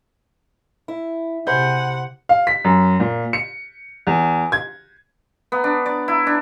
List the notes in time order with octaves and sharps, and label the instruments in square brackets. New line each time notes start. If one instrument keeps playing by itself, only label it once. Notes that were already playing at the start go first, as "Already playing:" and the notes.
[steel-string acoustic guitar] E4
[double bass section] C3 [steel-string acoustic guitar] G#4 [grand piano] C5 B5 G6 [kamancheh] F#5
[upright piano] F5
B6
F#2
A#2
C#7
E2
G#6
[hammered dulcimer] B3
D4
D5
E4
D4